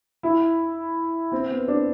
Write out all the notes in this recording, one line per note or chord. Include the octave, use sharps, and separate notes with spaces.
E4
C4
B3
D4